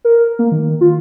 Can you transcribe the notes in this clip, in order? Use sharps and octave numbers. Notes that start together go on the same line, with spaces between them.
A#4
A#3
D#3
F4